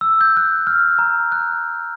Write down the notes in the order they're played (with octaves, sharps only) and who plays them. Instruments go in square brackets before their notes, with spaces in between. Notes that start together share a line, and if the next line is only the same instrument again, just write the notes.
[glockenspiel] E6
G6
F#6
F6
A#5
F#6